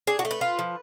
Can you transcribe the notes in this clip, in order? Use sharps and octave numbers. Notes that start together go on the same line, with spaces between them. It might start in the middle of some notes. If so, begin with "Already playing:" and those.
D4 G#4
F#4
A3
B4
F4
F3